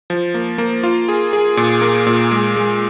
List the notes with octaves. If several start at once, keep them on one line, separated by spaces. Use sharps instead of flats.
F3
A#3
A#3
F4
G#4
G#4
A#2
A#3
A#2
G#3
G#3